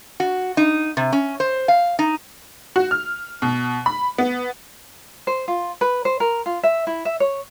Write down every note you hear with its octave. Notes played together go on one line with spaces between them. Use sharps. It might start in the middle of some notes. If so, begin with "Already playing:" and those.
F#4
D#4
C3
C#4
C5
F5
D#4
F#4
F6
B2
B5
B3
C5
F4
B4
C5
A#4
F4
E5
E4
E5
C#5